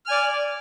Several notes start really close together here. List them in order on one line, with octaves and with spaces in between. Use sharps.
F6 G#5 D5